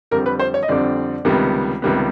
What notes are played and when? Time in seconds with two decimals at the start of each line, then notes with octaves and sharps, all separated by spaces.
0.11 F2 D3 G3 C4 A#4
0.26 B4
0.39 C5
0.54 C#5
0.63 D#5
0.68 F2 D3 G3 C4 D5
1.25 C#2 C3 D#3 G3 B3
1.82 C#2 C3 D#3 G3 B3